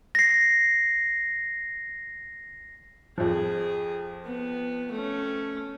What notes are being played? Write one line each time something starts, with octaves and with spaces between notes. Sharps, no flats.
A#6 C7
F2 F3 G#4
B3
A3 C#4